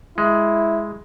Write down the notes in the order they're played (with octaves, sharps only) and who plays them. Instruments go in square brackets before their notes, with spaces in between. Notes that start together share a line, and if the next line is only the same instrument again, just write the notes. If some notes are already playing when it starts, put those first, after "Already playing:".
[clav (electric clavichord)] G#3 [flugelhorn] E4